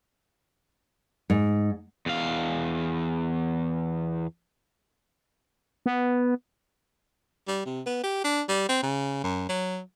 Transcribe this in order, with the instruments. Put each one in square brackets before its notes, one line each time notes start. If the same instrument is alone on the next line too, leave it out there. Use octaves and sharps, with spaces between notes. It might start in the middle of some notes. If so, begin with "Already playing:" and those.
[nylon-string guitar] G#2
[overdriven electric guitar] E2 F5
[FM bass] B3
[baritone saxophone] G3
C3
B3
G4
D4
G3
C4
C#3
F#2
F#3